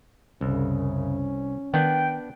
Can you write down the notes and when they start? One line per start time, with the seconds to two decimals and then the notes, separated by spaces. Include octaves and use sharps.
0.41 C2 F#2 C#3 C#4
1.74 D#3 B3 D4 G5